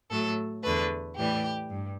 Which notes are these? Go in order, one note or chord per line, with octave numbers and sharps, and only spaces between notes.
A2 F#3 A3 A4
E2 D3 A3 B4
A2 E3 G3 G4
G2